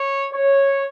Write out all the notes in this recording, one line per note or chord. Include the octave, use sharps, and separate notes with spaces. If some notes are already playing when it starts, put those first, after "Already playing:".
Already playing: C#5
C#5